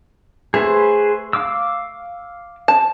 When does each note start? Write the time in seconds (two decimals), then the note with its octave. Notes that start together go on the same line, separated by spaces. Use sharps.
0.54 A3 G#4 B4 C5
1.33 F5 D6 E6
2.68 A5